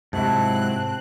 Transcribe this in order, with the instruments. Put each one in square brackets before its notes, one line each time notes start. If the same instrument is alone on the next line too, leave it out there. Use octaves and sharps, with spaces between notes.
[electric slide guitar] G#2 F#3 E4 [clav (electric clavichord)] C3 [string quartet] C4 F#6 [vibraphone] A5